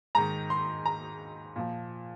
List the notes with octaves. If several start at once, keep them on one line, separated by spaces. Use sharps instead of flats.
G#2 D#3 A#5
C6
A#5
A#2 F3